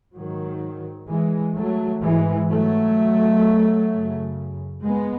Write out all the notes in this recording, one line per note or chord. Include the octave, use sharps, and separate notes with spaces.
G#2 D#3 F#3
E3 G#3
F#3 A3
G#2 E3 G#3
F#3 A3
F#2 C#3
G#3 B3